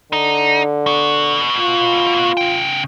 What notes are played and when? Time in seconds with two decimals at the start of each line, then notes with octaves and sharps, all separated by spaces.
0.13 D3 D#4
0.86 B3 F#4
1.60 F4
2.37 C#3 G5